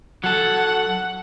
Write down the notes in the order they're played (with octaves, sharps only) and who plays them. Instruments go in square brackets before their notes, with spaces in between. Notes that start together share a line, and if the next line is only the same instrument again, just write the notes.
[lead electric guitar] F#3 A4 [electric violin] F#5